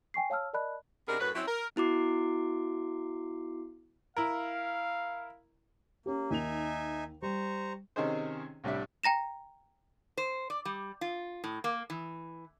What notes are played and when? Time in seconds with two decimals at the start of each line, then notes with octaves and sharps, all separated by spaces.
0.14 G5 G#5 C#6 C7
0.30 C#5 F5 A5 E6 F6
0.53 A#4 D5 D#5 A5 B5 F#6
1.08 C3 B3 D4 D#4 G#4 A#4
1.20 F#2 A2 F#4 B4
1.35 F#3 C4 C#4 E4
1.48 A#4
1.76 B3 E4 F#4 D6 C7
4.17 E4 A#4 F5
6.06 A#3 C#4 G4
6.31 D#2 D#3 D#4 E5 G#5 F7
7.22 G3 C5 A#5 C#6
7.96 C3 D#3 C#4 D#4 G#4 C5
8.64 C2 A2 G3 D4 E5
9.04 G5 A#5 A#6 E7
10.17 C5
10.50 D5
10.65 G3
11.01 F4
11.44 A2
11.64 A#3
11.90 E3